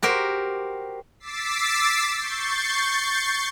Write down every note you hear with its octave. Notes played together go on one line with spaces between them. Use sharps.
F#4 G4 A#4 C5
D6 E6 A6 B6 C7
C#6 G6 A6 C7